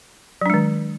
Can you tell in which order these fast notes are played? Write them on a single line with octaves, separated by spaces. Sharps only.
F#3 D4 G#3 D#3